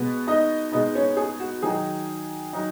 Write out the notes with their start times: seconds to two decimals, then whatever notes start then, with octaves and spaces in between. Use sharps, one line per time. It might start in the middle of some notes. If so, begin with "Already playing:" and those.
Already playing: B2 G#3 B3 B4
0.27 D#4 D#5
0.72 B2 G#3 B3 D#4 D#5
0.95 C#4 C#5
1.17 G#4
1.40 F#4
1.62 D#3 F#3 D#4 G#4
2.53 F#3 D#4